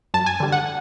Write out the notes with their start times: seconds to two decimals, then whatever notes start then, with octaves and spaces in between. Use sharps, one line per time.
0.14 F#2 A5
0.26 G#5
0.40 D3 G3
0.52 F#5